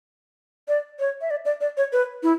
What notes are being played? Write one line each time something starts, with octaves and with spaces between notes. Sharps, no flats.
D5
C#5
E5
D5
D5
D5
C#5
B4
E4